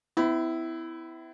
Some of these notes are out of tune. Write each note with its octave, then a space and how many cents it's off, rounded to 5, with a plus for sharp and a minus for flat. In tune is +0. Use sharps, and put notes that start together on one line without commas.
B3 +45 E4 -5